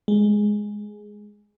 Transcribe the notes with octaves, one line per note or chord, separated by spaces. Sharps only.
G#3